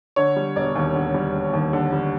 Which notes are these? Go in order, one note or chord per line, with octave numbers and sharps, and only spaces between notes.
D3 C#5
G3
E1 D5
D#2
D3
G3
E1
D#2
D3
G3